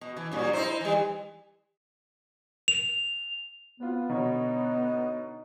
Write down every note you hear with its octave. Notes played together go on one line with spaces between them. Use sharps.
B2
E3
G2 A#2 F#3
D#4 E4 C5
E3 G3
F7
B3 C4 F4
B2 D3 D#4 C#5